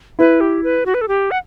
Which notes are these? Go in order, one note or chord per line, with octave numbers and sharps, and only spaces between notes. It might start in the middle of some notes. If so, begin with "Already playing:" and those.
E4 B4
G4
B4
F#4
B4
A4
G4
F#5